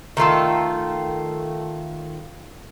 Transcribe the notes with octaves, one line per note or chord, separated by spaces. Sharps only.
D#3 A3 F4 A4